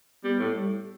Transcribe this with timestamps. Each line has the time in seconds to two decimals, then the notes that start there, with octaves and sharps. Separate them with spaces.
0.24 G3 B3
0.40 A2
0.55 G3